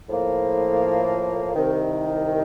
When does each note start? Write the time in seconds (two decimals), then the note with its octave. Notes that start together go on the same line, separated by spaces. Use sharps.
0.08 A2 F3 A#3
1.54 C2 C3 D#3